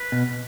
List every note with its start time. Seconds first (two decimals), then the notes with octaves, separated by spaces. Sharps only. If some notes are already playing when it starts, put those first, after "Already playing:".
Already playing: B4
0.12 B2